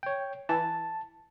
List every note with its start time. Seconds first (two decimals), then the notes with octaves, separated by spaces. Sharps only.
0.03 C#5 G5
0.49 E3 A5